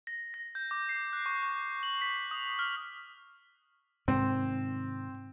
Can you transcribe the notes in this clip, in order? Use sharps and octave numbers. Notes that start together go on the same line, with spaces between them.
A#6
A#6
G6
D6
C7
F#6
C#6
C#6
F#7
B6
D#6
F6
G#2 C3 D#3 C4